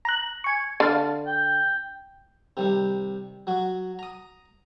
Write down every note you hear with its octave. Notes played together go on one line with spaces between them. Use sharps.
A#5 F#6
G#5 C#6
D3 F5 A5
G5
C3 D#3 G3
F#3 F#4
A#5 D#6